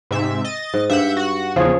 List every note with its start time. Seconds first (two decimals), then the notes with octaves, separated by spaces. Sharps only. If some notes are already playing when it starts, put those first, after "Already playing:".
0.11 G#2 C3 E5
0.44 D#5 A6
0.74 G#2
0.90 G2 E5 F#5 G6
1.17 F#4 F#5
1.56 E2 C#3 F3 G#4 C#5